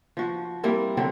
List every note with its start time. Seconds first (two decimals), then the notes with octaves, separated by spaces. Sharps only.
0.17 F3 F#4
0.63 G3 A#3 C4 E4
0.97 D3 F#3 C4 A4